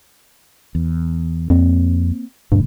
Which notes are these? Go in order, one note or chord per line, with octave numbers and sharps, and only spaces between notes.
E2
F2 A#3 C4
D#1 D2 G2 B2